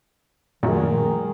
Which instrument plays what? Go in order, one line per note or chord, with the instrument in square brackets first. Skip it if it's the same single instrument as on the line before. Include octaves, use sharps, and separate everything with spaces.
[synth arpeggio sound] F#2 A#2 [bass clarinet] D#3 [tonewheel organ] F3 G3 A3 [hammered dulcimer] G#4 A#4